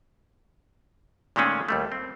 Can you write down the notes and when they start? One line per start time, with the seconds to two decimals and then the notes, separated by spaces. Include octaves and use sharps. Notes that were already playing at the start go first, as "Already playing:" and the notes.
1.36 A#2 D#3 G#3 A3 C#4 G#4
1.69 D#2 G3 A3
1.92 C4